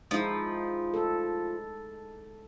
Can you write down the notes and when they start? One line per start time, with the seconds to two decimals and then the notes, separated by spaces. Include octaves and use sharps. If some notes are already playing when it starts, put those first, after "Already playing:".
0.11 F3 G#3 D#4 E4
0.94 A4